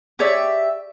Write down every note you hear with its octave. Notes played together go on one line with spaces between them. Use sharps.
G4 G#4 C#5 D5 E5